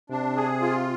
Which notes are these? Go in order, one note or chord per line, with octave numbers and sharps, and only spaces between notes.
C3 D4
G#4
F4